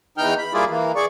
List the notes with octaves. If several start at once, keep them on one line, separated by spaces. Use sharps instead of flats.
E2 E3 D#4 G5 F6 G6
B5
G3 A#3 E4 F4 G#4 D5
E3 A#3
G#4 D5 C#6